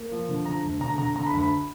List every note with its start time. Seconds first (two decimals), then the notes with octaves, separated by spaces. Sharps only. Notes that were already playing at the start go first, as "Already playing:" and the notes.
Already playing: A#3
0.11 F3
0.29 D3
0.45 D3 A#5
0.64 D2
0.80 D3 A#5
0.98 D3 A#5
1.16 D3 A#5
1.27 B5
1.33 D2
1.39 B5